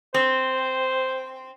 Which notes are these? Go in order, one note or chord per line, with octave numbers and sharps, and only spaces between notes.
C4 C5